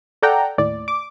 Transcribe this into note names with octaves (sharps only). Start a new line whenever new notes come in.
A4 D5 F#5 G5 A#5
D#2 A2 D5
D6